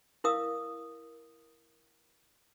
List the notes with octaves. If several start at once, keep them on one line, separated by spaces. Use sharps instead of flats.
E4 A#4 F5 D#6 E6